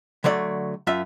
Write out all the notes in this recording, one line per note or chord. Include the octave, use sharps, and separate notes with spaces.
D3 F#3 A3 D5
F#2 F4 E5